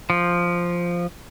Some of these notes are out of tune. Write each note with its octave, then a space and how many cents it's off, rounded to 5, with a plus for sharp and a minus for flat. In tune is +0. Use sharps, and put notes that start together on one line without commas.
F3 +0